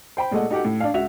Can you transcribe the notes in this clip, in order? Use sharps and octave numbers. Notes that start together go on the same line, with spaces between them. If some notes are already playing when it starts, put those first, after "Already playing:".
C5 G5 B5
A#2 G#3 A3 D#5 F#5
D#4 F#4 G4 A4 F#5
A2
D4 F5
C#2 F#4 E5 F7